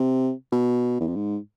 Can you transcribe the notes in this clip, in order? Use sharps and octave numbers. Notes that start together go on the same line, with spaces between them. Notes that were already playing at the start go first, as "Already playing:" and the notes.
Already playing: C3
B2
E2
F2
G#2